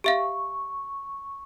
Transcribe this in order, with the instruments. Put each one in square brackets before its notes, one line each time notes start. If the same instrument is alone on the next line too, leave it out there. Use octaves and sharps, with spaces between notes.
[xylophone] G4 E5 F5 [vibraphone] C#6